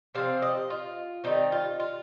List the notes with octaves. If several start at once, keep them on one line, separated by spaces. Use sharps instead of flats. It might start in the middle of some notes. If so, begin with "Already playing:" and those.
C3 F3 C4 F5
D#5
F4
D#3 G3 C4 D#4
F4
F4